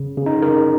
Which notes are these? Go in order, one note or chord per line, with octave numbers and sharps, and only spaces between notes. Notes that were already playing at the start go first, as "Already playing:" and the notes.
Already playing: C#3
C#3
D#4
C#3 A#4